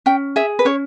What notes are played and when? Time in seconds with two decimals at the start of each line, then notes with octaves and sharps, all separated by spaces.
0.06 C#4 G5
0.36 G#4 E5
0.59 B4
0.65 C#4 C#5